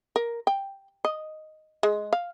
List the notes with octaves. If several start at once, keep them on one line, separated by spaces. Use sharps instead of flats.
A#4
G5
D#5
G#3
F5